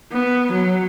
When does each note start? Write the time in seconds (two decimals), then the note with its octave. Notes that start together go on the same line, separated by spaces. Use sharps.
0.12 B3
0.52 F#3